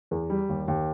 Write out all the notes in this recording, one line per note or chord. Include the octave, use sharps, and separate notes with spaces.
E2
G3
D#2
D#2